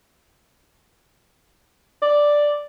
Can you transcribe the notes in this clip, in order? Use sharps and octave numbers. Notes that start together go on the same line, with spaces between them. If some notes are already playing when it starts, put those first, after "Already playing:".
D5